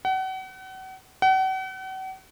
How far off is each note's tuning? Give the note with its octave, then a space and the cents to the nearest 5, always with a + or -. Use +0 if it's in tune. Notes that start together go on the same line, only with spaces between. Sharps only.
F#5 +35
F#5 +40